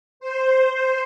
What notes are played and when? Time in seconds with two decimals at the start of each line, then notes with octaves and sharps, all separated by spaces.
0.20 C5